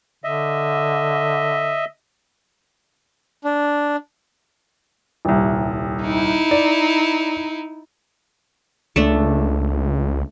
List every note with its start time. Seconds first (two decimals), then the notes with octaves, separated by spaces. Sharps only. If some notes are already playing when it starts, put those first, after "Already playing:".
0.24 D3 D#5 E5
3.45 D4
5.25 D#1 C2
6.04 D#4 E4
6.51 D5
8.96 C#2 A3 D4